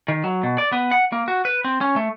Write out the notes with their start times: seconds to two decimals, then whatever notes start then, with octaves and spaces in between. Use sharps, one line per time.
0.08 D#3
0.24 F#3
0.43 B2
0.58 D5
0.72 B3
0.91 F#5
1.12 A#3
1.28 F#4
1.45 B4
1.64 C4
1.81 C#4
1.96 A3